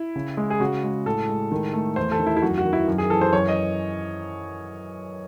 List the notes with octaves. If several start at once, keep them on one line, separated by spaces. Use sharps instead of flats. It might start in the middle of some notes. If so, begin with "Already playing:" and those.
Already playing: E4
C#3
G#3
G#4
C#3 F#4
G#3
A2 A4
G#3
D#3
A3
E2 C5
A4
D#3
E4
E4
F#2 F#4
F#4
D#3
E4
F#2
G#4
E3 A4
C5
F#2 C#5
D#5